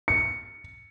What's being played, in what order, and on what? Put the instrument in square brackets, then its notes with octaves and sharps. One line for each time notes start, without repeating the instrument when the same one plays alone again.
[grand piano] C#7